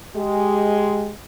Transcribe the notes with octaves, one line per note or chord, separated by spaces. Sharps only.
G#3 G4